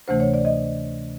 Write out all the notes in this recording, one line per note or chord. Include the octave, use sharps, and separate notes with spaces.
D2 C3 E3 A3 C5
C#5
D5
D#5